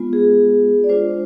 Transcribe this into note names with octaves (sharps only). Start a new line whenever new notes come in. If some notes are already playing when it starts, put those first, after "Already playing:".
Already playing: G#3 B3 F4
G#4
D5
G#3 D4 F4 C5